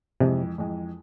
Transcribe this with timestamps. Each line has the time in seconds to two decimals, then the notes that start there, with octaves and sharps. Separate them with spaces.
0.20 F2 C3 E3 G#3
0.58 F2 E3 G#3